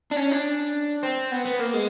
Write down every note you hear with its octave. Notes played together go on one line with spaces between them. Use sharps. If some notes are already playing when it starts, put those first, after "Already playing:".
D4
C#4
D4
C4
B3
B3
A#3
G#3